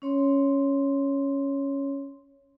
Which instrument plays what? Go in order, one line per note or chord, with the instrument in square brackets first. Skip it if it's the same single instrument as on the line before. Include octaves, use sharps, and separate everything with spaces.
[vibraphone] C#4 C#5 C6